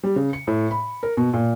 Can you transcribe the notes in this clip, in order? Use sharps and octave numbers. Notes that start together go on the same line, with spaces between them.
G3
C#3
C#7
A2
B5
A#4
B2
A#2